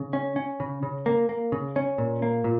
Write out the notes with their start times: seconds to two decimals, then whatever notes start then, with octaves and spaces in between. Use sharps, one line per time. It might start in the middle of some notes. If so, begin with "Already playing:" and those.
Already playing: C#3
0.13 C#4
0.36 C#4
0.60 C#3
0.83 C#3
1.06 A#3
1.29 A#3
1.52 C#3
1.76 C#4
1.98 A#2
2.22 A#3
2.44 A#2